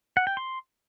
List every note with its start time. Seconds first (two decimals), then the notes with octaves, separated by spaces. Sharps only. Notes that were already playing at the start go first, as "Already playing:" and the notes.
0.17 F#5
0.27 G5
0.37 C6